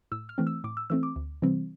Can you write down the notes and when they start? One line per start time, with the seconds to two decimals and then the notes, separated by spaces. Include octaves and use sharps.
0.12 A2 E6
0.29 F6
0.38 E3 A3 C4
0.47 E6
0.64 A2 D6
0.77 E6
0.90 E3 A3 C4 E6
1.03 D6
1.16 D2
1.42 C3 E3 G3 C4